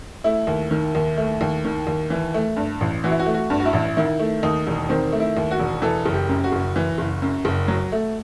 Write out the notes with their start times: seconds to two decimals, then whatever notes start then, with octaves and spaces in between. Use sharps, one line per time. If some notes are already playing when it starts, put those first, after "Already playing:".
0.24 A3 E4
0.47 D#2
0.71 D#3
0.95 D#2
1.17 A3
1.41 D#2
1.65 D#3
1.87 D#2
2.10 E3
2.34 A3
2.57 G2
2.81 A1
3.04 E3 F#4
3.11 E4
3.19 F#4
3.26 A3
3.34 F#4
3.50 G2
3.60 F#4
3.65 E4
3.73 A1
3.97 D#3 E4
4.20 A3
4.43 D#2 D#4
4.67 E1
4.89 D#3 C4
5.12 A3
5.20 E4
5.37 D#2
5.51 F#4
5.59 E1
5.82 E3 A4
6.05 F#1
6.13 G4
6.29 F#2
6.44 F#4
6.52 F#1
6.76 E3
6.98 F#1
7.22 F#2
7.45 F#1
7.68 F#3
7.92 A3